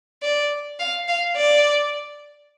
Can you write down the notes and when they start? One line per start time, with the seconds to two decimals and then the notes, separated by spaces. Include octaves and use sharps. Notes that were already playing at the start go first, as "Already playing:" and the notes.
0.22 D5
0.79 F5
1.08 F5
1.37 D5